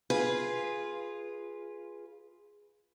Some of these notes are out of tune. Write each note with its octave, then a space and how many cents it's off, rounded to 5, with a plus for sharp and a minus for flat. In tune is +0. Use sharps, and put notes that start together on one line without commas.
F4 +0 G#4 +0 B4 -10